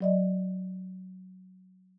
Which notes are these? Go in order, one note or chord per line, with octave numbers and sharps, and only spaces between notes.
F#3 D5 D#5